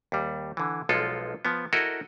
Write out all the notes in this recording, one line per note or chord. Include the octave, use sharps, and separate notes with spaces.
D#2 G3
D3 E3
B1 F3 G#3 F4 A4
F3 B3
E4 F#4 A4 A#4 D#5